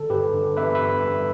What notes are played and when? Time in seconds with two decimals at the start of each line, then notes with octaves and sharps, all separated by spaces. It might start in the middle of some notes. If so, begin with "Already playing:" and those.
Already playing: D3 A4
0.10 G2 G4 B4
0.34 D3
0.57 B3 B4 E5
0.75 B4 E5
0.80 G2
1.03 G2